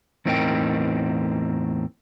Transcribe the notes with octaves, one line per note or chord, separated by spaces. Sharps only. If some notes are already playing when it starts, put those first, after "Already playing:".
E2 A2 C4 D#4 A#4 G5